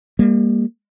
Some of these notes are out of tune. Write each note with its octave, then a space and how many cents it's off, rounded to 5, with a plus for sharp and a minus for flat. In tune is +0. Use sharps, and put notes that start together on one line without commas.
G3 +40 A#3 +0